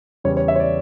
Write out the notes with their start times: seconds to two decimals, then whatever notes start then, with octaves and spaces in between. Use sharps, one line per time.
0.24 E2 C#3 G3 C#5
0.37 C#5
0.48 E5
0.56 C#5
0.60 D5